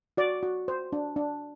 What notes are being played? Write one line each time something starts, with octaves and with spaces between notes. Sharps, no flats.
F#4 D5
F#4
C5
D4
D4